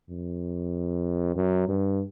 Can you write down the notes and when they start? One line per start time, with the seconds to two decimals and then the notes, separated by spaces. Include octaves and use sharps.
0.10 F2
1.36 F#2
1.69 G2